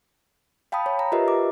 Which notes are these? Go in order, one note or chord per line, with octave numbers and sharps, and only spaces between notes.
F5 G5 A5 B5 D#6
C#5
A#5
F4 G4 A#4 B4 D#5 E5
D6